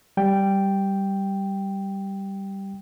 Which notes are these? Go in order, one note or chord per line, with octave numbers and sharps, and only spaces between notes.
G3 G5